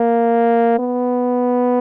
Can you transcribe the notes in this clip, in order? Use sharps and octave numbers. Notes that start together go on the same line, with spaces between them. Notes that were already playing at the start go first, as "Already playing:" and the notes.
Already playing: A#3
B3